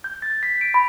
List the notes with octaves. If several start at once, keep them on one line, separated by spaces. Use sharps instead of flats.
G6
A6
B6
D7
B5